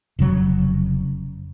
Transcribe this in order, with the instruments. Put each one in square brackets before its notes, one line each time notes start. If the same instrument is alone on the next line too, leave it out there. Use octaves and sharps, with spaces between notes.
[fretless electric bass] F1 C#3 F#3